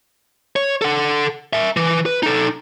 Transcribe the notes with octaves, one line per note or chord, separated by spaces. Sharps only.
C#5
A4 F#5
A#4 E5
E3
B4
D#4 A4